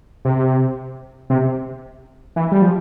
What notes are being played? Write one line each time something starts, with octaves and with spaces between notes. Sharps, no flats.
C3
C3
E3
G3
F3